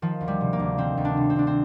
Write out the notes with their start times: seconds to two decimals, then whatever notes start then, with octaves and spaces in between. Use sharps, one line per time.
0.02 D#3 F3
0.21 D2
0.28 G3
0.41 C3
0.53 A#3
0.59 D2
0.78 D#3 C4
0.97 D2
1.05 D4
1.17 C3
1.30 C4
1.36 D2 D4
1.47 C4